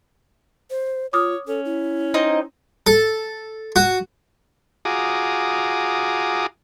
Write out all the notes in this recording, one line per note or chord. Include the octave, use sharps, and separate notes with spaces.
C5
F4 C#5 D6 D#6 F6
C#4 A4
E4
C4 D#4 D#5
A4
F#4
F4 F#4 G#4 A#5 D6 D#6